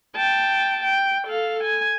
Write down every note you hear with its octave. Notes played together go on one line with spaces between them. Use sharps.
G5 A5
G5
A4 F5
G#5